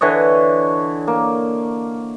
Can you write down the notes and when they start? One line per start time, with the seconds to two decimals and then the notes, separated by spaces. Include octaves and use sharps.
0.01 D3 E3 C#5 D#5
1.08 A#3